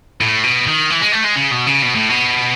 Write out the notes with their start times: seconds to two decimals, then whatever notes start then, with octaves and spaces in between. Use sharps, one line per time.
0.21 A2
0.44 B2
0.67 D#3
0.91 E3
1.02 G#3
1.13 A3
1.25 G#3
1.36 C#3
1.51 B2
1.66 C#3
1.82 B2
1.95 A2
2.09 B2